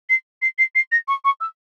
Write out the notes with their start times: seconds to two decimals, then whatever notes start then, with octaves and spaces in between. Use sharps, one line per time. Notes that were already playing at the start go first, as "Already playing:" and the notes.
0.09 C7
0.42 C7
0.59 C7
0.75 C7
0.92 A#6
1.08 C#6
1.24 C#6
1.40 E6